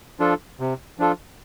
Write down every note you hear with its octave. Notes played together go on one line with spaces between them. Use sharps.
F3 D4 F4 A4
C3
F3 D4 F4 A4